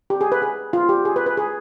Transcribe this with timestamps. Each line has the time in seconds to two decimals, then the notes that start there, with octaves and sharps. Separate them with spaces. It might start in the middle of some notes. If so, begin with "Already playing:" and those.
0.10 G4
0.21 G#4
0.32 B4
0.42 G#4
0.73 F4
0.89 G4
1.05 G#4
1.16 B4
1.26 B4
1.37 G#4